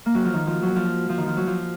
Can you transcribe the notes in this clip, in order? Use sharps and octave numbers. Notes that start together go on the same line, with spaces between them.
A#3
F#3
F3
D#3
F3
F#3
F3
F3
D#3
F3
F#3
F3